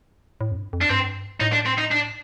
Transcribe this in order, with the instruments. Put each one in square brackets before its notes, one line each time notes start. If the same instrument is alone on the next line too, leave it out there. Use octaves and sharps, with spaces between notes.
[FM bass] A2
F2
G2
F2
[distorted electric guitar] D4
[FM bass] G2 [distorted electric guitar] C4
[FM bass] A2 [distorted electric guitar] D#4
[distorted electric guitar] D4
C4
D#4
D4